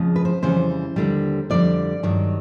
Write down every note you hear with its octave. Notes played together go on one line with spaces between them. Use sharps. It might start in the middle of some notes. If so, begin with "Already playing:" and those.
Already playing: F2 C#3 F3 G#3
B4
C5
F2 C#3 E3 G3 C5
D#2 D3 G3
F2 D3 G3 D5
G2 D#3 F#3